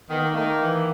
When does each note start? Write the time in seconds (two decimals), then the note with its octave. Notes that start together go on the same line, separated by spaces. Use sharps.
0.10 D#3 B3
0.22 A#3
0.33 D#3 A3
0.44 A#3
0.60 E3